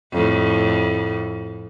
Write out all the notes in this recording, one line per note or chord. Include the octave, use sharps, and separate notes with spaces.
F2 A2